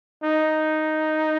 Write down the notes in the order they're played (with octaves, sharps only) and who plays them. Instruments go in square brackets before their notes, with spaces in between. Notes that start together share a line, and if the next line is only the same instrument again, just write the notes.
[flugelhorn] D#4